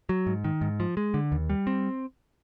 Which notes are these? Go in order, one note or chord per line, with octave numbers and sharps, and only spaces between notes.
F#3
G#2
D#3
G#2
F3
G#3
D3
D#2
G3
C4